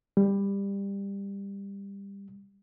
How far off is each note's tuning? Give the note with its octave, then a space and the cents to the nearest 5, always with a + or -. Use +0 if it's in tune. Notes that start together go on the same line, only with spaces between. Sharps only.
G3 +20